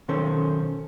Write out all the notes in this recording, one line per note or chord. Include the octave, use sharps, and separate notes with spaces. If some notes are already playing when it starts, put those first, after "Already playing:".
B1 D#3 C#4 A4 C5